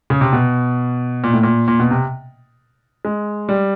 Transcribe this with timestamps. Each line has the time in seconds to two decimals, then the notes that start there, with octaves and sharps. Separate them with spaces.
0.10 C#3
0.21 C3
0.33 B2
1.24 A#2
1.33 A2
1.43 A#2
1.68 A#2
1.80 B2
1.91 C3
3.05 G#3
3.49 G3